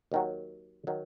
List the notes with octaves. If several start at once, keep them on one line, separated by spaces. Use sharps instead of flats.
D#2 D#3 F#3
D#3 F#3